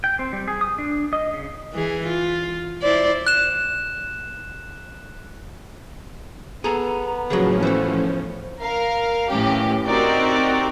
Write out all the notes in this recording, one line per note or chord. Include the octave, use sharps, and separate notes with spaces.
G5
C4
G3
G#4
D#6
D4
D#5
C#3
E3 G#4
F4
E4 C5 D5
F#6 E7
B3 G#4 A4 A#5
A2 C#3 F3 F#3 C#4 G#4
E3 A3 B3 C5
A#4 F5
A2 E3 C#4 G4
C4 D#4 F#4 G4 A#4 D5